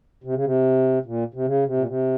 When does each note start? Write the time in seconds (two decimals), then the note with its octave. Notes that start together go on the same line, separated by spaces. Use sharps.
0.24 C3
0.34 C#3
0.45 C3
1.06 A#2
1.34 C3
1.46 C#3
1.66 C3
1.77 A#2
1.87 C3